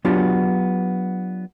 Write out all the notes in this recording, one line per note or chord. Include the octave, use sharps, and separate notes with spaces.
F#3 B3 D4 F4 G4